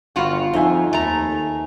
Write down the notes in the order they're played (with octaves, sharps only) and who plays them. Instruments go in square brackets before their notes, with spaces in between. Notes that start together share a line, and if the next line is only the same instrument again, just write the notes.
[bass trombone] G1 [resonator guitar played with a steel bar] G2 F4 F#4
[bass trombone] F2 [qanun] D#4 [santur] C5 E5 G#5
[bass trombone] D#2 [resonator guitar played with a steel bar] A3 A#5